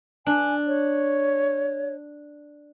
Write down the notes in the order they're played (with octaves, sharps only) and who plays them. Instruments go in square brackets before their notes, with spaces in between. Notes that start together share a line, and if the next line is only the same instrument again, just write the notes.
[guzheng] D4 [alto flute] G#5
[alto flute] C#5